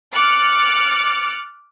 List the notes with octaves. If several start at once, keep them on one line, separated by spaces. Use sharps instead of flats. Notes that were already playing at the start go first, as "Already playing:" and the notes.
D6 F6 F#6 A6 C#7